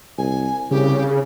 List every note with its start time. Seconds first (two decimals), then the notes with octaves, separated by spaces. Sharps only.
0.18 C2 G#5
0.71 C2 C#3 G4